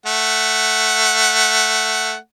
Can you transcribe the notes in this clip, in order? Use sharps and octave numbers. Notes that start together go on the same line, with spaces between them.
A3 F#5